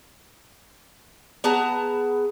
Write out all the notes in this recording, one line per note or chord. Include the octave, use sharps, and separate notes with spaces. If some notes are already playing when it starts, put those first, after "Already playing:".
B3 G#4 A5 A#5